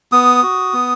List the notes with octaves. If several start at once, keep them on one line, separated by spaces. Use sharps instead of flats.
B3 D#6
F#4
B3